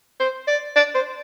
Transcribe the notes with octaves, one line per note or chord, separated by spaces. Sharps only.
C5
D5
D5
C5